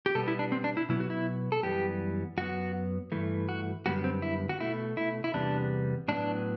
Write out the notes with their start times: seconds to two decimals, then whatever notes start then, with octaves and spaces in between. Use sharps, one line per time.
0.06 G4
0.15 B2 G3 B3 A4
0.28 E4
0.39 D4
0.52 C4
0.64 D4
0.77 E4
0.89 B2 F#3 B3 E4
1.00 F#4
1.10 E4
1.52 A4
1.63 F#2 E3 G3 B3 G4
2.38 F#2 F#3 B3 F#4
3.12 G2 E3 A3
3.49 F#4
3.86 F#2 D3 G3 B3 F#4
4.04 C4
4.22 E4
4.49 F#4
4.60 B2 A3 E4
4.97 E4
5.24 E4
5.34 E2 C3 G3 B3 D4
6.08 A2 F#3 B3 D4